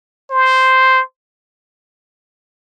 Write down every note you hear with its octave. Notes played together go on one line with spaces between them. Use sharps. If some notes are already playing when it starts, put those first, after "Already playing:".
C5